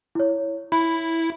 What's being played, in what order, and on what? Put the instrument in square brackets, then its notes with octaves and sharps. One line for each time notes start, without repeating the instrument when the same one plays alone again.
[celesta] E4 C#5
[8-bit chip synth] E4 [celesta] B5